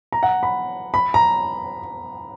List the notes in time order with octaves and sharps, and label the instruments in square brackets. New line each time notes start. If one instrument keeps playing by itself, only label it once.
[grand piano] A#5
F#5
B5
B5
A#5